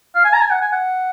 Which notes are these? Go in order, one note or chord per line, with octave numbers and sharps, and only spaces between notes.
F5
G#5
A#5
G#5
F#5
G#5
F#5